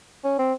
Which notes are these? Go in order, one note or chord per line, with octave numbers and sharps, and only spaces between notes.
C#4
C4